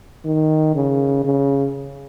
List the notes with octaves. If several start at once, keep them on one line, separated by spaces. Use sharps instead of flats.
D#3
C#3
C#3